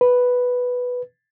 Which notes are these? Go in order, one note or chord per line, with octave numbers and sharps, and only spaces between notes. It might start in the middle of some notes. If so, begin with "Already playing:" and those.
B4